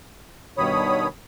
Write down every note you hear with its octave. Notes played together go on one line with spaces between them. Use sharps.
G2 B2 D#3 C#5 B5 D#6